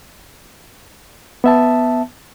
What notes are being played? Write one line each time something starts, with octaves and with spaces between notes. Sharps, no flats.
B3 E5 A5